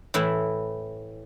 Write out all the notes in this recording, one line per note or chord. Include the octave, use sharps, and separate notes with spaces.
A2 E3 E4